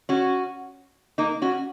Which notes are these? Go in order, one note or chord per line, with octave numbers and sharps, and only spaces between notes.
C#4 F#4
A#3 D#4
C#4 F#4